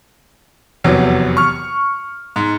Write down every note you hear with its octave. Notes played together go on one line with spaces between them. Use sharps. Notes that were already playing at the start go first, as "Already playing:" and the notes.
F1 E2 C3 F#3 B3
C#6 F6
G#2